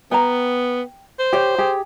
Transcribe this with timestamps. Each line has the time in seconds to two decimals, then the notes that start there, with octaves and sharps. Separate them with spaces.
0.11 B3 G5 A#5
1.19 C5
1.33 G4 C#5 G5
1.58 G4 G#4